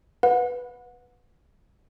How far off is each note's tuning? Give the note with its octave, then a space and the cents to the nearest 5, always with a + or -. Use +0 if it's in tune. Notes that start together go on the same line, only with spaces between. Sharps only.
B4 +0 F#5 -30